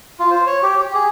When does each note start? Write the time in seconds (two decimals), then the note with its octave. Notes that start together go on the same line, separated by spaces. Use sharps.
0.19 F4
0.31 C5
0.47 C#5
0.63 G4
0.80 G4
0.94 G#4